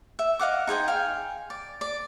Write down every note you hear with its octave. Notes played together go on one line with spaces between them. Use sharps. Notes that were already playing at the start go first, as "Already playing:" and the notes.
E5
D#5 F5 F#5 D6
D#4 G#4 C5 G5
F5 G5 G#5
D5
D5